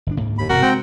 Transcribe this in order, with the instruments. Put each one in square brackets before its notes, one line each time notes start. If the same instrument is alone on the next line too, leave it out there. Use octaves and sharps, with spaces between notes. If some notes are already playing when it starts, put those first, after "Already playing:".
[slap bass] G1 B2 D4
D2 G#2 A#3
[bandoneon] D#2 B5
[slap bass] E1 C3 [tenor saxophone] F#4 [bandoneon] A#4
[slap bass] G#3 [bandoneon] C4 G5